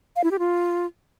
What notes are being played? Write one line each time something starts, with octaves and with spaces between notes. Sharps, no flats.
F5
E4
G4
F4